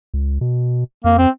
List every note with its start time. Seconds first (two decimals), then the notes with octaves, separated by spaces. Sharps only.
0.14 C#2
0.41 B2
1.04 F2 A#3
1.18 C4